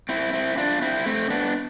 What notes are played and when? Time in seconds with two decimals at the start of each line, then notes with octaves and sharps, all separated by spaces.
0.09 C4 E4
0.33 C4 E4
0.57 D4 F4
0.82 C4 E4
1.06 A3 C4
1.30 B3 D4